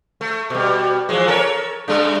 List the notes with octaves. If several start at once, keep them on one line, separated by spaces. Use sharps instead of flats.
A3
B2 G3
E3 F3 G#3
A4 A#4 C#5
G3 A3 D4